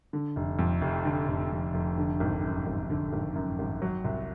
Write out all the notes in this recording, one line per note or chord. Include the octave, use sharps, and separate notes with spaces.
D3
F1
F2
F1
D3
F1
F2
F1
D3
G#1
F#2
G#1
D3
G#1
F#2
G#1
F#3
C2